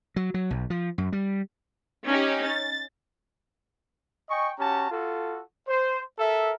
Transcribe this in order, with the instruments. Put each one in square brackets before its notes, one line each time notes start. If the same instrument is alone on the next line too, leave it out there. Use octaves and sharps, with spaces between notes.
[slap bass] F#3
F#3
B1
F3
F#2
G3
[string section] C#4 D#4 G4
A6
[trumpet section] D#5 G5 G#5 C#6
C#4 F#4 G4 A5 A#5
F4 F#4 A4
C5
A4 A#4 E5